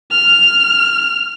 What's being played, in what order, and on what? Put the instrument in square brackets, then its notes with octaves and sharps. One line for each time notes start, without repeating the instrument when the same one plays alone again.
[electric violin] F6